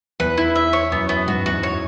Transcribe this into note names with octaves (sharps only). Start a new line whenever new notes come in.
E2 B4
E4
E5
C#5
F#2 B3
B3
G#2 F#4
E2 F#4
C#5